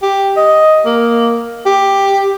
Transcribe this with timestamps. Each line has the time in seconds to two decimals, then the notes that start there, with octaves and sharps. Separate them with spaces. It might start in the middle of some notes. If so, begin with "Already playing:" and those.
0.02 G4
0.37 D#5
0.85 A#3
1.66 G4